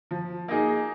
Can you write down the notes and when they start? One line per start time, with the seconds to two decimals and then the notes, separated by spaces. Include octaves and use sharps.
0.11 F3
0.48 A#3 D#4 G#4